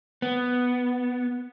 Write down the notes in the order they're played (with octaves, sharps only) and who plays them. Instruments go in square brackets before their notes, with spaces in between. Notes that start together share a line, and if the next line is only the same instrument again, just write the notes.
[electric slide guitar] B3